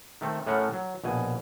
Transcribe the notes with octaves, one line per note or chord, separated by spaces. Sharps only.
D#3 A3 C4 A4
A2 A3 C#4 A#4 F#5 A5
F#3
A#1 B2 G#5